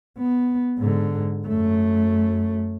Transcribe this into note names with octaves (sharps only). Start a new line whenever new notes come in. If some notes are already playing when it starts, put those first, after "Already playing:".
B3
G#2 D3
F#2 A3